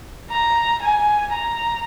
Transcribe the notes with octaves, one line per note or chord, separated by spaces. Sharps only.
A#5
G#5
A#5